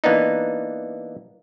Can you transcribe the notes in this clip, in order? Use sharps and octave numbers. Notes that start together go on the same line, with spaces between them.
E3 A#3 B3 D4 D#4